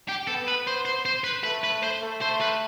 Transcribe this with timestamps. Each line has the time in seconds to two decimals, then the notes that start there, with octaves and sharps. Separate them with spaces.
0.09 G4
0.27 B3 A4
0.47 B4
0.67 C5
0.85 C5
1.06 C5
1.24 B4
1.44 A3 B4
1.64 B4
1.83 C5
2.02 A3
2.22 C5
2.41 B4